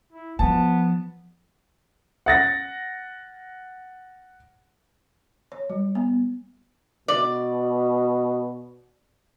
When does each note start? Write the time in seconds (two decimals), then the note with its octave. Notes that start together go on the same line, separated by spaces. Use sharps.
0.12 E4
0.39 F3 B3 A5
2.26 F#5 A6 A#6
5.52 C#5
5.70 G3
5.95 B3
7.08 B2 D5